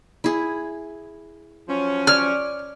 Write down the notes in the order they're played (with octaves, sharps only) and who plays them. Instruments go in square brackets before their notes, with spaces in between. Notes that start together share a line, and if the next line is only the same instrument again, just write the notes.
[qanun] E4 G#4
[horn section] F3 F#3 C#4
[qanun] C#5 D5 [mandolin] F6